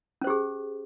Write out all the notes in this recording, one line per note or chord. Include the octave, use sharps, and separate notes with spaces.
C#4 G4 G#4 C5